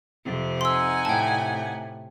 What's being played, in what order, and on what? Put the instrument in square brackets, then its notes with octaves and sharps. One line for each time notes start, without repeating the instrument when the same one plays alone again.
[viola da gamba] F2 C3 C4
[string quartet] D#4 F#5 G#5 [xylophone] C6 E6
[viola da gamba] A2 C3 [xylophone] G5 A5